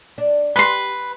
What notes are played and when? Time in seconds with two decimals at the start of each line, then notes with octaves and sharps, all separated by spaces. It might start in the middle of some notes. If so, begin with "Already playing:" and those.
0.18 D4
0.56 G4 B4 C6